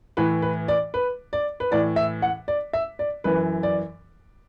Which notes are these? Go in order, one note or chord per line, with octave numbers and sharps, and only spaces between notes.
A2 E3 B4
B4
D5
B4
D5
B4
A2 E3 D5
E5
F#5
D5
E5
D5
F#2 E3 B4
D5